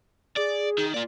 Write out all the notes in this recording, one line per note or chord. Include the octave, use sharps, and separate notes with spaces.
G#4 D5
D#3
A#3 F4 D5